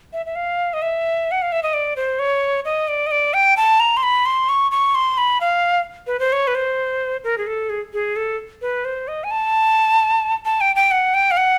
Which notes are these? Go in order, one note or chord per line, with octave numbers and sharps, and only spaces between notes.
E5
E5
F5
D#5
E5
F#5
F5
E5
D#5
D5
C5
C#5
D#5
D5
D#5
D5
G5
A5
A#5
C6
B5
C6
C#6
C#6
C6
B5
F5
B4
C5
C#5
B4
C5
A#4
G#4
A4
G#4
G#4
A4
B4
C5
D#5
G#5
A5
A5
G5
G5
F#5
G5
F5
F#5